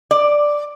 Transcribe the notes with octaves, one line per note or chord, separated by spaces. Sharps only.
D5